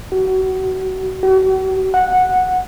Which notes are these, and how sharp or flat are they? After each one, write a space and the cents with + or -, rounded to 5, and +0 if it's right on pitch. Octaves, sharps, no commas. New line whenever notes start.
F#4 +30
F#4 +45
F#5 -10